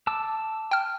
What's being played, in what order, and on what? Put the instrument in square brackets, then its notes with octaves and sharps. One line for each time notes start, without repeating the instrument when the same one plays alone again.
[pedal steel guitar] A5 D6 E6
[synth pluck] G5 F6